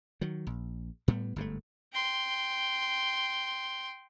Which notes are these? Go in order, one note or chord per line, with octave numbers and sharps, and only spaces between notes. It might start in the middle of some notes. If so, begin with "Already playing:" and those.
D#3 F#3
A#1
A2 G3 B3
G1 G#2 C#3 A3
G5 C6